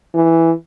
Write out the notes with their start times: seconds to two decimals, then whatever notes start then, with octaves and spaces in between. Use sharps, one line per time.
0.14 E3